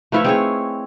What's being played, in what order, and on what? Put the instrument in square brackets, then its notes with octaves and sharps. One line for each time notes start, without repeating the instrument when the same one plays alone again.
[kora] F3 B4 F5 [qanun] A3 E4 C#5
[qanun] C4 C#5 [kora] D#4 G#4